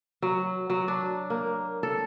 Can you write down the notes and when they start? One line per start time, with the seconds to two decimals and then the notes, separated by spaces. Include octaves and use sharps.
0.22 F#3
0.70 F#3
0.88 D4
1.30 A#3
1.83 A4